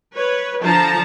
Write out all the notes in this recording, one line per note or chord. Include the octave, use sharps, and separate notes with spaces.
B4 C#5
D3 F3 A5 A#5